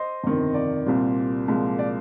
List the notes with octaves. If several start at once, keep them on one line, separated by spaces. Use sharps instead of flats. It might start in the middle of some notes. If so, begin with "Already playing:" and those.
Already playing: C5 D#5
G1 F2 C3 D#3
D5
C2 A#2 G3 C4
C2 A#2 F3 G#3
D5